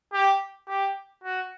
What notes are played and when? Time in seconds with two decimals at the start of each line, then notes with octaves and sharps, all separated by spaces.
0.13 G4
0.68 G4
1.24 F#4